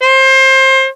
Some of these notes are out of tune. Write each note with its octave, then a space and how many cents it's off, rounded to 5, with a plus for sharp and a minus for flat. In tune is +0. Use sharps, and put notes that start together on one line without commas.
C5 +25